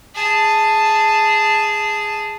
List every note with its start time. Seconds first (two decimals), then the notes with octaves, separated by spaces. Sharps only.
0.15 G#4 A5